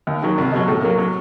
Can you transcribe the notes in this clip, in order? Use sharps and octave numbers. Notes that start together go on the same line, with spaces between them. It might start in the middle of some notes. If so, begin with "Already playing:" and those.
D#2
D#3 F#3
C2
B2 F#3
A2
F#3 A#3
F#3